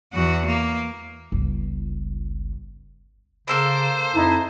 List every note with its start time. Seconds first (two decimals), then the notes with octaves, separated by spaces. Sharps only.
0.13 E2 F#4
0.46 A#3
1.32 G1 C#2
3.48 C#3 A#3 A4 A#4 C5
4.14 F2 D#4 E4 A5